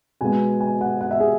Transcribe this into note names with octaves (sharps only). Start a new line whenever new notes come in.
B2 G#3 B3 G#5
G#5
F#5
F#5
E5
G#4